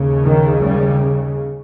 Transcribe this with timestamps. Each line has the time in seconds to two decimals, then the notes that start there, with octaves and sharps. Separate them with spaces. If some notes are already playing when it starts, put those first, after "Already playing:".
Already playing: D#2 C#3
0.24 D#3
0.63 G3